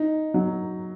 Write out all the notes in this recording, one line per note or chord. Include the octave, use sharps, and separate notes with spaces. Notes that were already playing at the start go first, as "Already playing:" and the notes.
Already playing: D#4
F#3